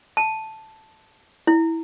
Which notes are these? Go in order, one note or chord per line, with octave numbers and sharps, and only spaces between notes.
A5
E4